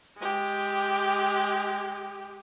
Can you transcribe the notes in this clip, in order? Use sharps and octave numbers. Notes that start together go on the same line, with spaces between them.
G#3 G4